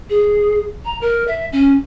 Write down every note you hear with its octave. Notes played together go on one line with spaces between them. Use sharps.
G#4
A#5
A#4
E5
C#4